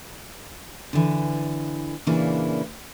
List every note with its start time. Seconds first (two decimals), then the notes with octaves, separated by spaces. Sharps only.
0.93 D3 E3
2.07 A#2 C#3 E3 A#3 D4 E4